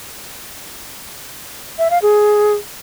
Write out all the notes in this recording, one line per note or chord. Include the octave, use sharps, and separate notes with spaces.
E5
F5
G#4